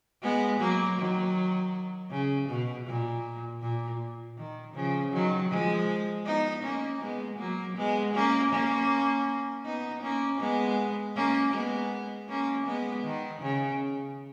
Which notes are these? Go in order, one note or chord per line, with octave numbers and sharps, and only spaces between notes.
G#3 B3
F#3 A#3
D#3 F#3
C#3
B2
A#2
A#2
D#3
C#3 F3
D#3 F#3
F3 G#3
B3 D#4
A#3 C#4
G#3 B3
F#3 A#3
G#3 B3
A#3 C#4
A#3 C#4
B3 D#4
A#3 C#4
G#3 B3
A#3 C#4
G#3 B3
A#3 C#4
G#3 B3
D#3
C#3